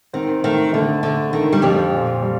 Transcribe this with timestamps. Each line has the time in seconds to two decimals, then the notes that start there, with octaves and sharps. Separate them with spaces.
0.13 D#3 C4
0.44 D#3 A3
0.73 D3 A3
1.03 D3 A3
1.33 D3 D#3
1.53 G3
1.62 F2 F3 G4
1.92 A#2
2.22 G3